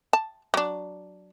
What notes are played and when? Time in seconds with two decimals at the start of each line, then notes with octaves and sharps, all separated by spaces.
0.13 A5
0.54 F#3 D4